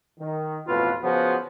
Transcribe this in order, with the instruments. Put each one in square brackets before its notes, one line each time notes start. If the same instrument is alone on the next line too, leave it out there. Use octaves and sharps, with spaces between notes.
[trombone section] D#3
A1 F2 B2 F4 B4
C#3 F3 B3 F#4 C5